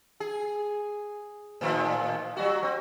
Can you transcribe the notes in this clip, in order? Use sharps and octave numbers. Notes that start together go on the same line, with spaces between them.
G#4
A2 D#3 F3
F#3 G3 F#4
C4